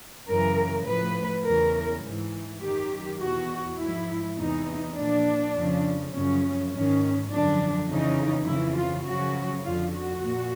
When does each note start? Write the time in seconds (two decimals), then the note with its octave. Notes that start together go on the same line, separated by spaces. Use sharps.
0.28 F#2 C#3 E3 A#4
0.86 A2 F3 B4
1.45 E2 C#3 E3 A#4
2.04 G#2 E3
2.62 F#2 D#3 G4
3.20 E2 B2 F#4
3.79 G#2 F3 E4
4.38 E2 C3 E3 D#4
4.96 A#2 F3 D4
5.55 F2 C#3 F3
6.12 F#2 C#3 F3 C#4
6.72 G#2 D#3 C#4
7.30 F#2 D3 F3 D4
7.89 F2 C#3 E3 D#4
8.47 F2 C#3 E3 E4
8.76 F4
9.05 F#2 C#3 F3 F#4
9.64 F2 D3 F3 F4
9.94 F#4
10.22 A#2